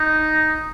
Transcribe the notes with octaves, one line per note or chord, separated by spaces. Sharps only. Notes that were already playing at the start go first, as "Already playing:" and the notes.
Already playing: D#4